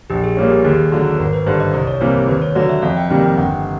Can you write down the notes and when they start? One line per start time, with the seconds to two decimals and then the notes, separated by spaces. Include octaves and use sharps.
0.10 A#1 G4
0.24 G#4
0.37 A#2 G3 A#3 C#4 G4
0.50 G4
0.65 D#2 G#4
0.92 D3 F#3
1.19 G#1 A#4
1.33 B4
1.46 G2 D3 C5
1.60 D#5
1.73 C2 D5
1.87 C#5
2.01 C3 E3 G3 A#3 C5
2.28 D#2 B4
2.42 C#5
2.55 D3 F#3 D5
2.69 E5
2.82 F2 F5
2.97 G5
3.10 C3 D#3 G3 A#3 G5
3.24 G5
3.37 G1 F#5